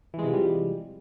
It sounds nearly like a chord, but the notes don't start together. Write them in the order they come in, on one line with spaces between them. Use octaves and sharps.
E3 G#3 C3 F3 G3